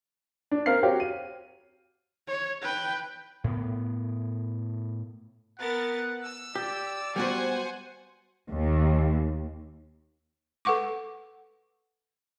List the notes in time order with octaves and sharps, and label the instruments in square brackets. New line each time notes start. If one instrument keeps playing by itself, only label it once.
[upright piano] D4
C4 A#4 F5 F6 C7
F#4 G4 C5 C#5 F5 G5
D#7
[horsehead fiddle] C#5
B4 G5
[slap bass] A2 B3
[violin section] B3 A#4 A6 [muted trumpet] F#5
[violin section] E6
[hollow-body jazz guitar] G4 [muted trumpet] D5
[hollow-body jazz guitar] G3 B3 F#4 [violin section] C5 F#5 G#5
[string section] D#2
[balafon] A4 B4 F#5 C#6 D6